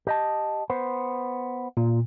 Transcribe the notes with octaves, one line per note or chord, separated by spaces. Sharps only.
G4 D#5 A5
B3 C5
A#2